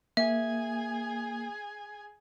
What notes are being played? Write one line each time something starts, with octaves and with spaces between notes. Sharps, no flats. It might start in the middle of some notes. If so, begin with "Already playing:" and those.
A#3 G#4 E5 G#5